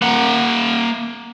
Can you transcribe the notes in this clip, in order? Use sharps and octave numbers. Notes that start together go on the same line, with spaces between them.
A#3 F#5